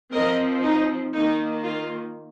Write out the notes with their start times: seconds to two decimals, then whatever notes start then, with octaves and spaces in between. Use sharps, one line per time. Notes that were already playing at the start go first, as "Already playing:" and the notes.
0.11 F3 C4 A#4 D#5
0.62 D#4
1.13 D#3 A#3 D#4
1.63 F4